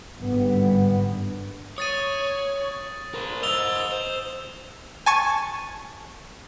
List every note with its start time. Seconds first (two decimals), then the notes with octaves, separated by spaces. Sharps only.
0.18 G#1 G2 D3 G3 B3
1.78 C#5 D#6 A6 D#7
3.14 A#4 C5
3.43 C5 D#5 E6 F7 G7
3.92 C5
5.06 G#5 A5 C#6 G#6